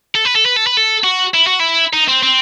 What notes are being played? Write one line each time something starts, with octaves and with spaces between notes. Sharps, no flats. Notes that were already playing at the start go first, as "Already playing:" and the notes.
A4
B4
A4
B4
A4
B4
A4
F#4
E4
F#4
E4
D#4
C4
C4